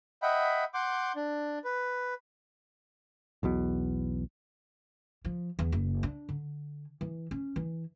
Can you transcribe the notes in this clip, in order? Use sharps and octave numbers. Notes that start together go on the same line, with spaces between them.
D#5 E5 F#5 G5 B5
F#5 C6 D6 G6
D4
B4
B1 E2 B2
F3
E2
F#1
D4
D3
E3
C#4
E3